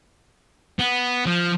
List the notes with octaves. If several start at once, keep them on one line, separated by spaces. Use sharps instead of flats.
B3
F3